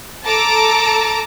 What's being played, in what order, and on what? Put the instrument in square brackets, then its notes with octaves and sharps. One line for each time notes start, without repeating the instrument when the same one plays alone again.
[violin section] A4 A5 A#5 D6 E6